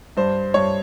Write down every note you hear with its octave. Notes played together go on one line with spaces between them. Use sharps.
G2 C5
G2 C#5